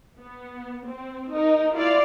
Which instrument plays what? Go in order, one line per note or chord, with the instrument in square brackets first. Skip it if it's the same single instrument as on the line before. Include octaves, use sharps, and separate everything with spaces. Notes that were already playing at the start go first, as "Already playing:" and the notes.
[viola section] B3
C4
D#4 A#4
E4 F4 D5 F5